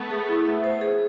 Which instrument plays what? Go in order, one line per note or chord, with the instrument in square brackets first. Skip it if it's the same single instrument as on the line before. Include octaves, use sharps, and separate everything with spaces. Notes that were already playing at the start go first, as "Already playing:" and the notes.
Already playing: [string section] A3 B3
[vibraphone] G#4
E4
E5
C5
G#4